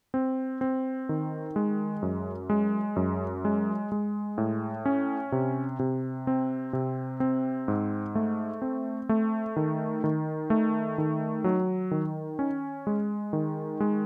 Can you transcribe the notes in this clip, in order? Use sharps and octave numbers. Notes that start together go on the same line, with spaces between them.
C4
C4
D#3
G#3
F#2
G#3
F#2
G#3
G#3
A2
C#4
C3
C3
C4
C3
C4
G#2
A3
C4
A3
D#3
D#3
A3
D#3
F#3
D#3
C#4
G#3
D#3
G#3